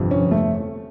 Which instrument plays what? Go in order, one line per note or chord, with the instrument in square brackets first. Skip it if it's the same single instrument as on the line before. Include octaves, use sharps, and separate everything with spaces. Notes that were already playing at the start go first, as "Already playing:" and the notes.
Already playing: [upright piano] G1 F2 C3
C#4
A3